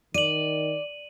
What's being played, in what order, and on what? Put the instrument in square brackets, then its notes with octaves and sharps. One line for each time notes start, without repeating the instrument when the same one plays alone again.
[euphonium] D#3 [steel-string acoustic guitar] D5 [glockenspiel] D#7 F#7